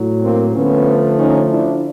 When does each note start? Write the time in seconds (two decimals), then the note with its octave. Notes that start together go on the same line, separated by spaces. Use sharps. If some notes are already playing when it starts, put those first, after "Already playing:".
Already playing: A2 F#3
0.22 A#3 C4
0.54 D3 F3 A3 B3 C#4
1.18 C#4 D#4
1.50 D4 E4